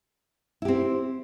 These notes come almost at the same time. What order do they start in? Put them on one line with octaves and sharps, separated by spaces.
E4 G4 C4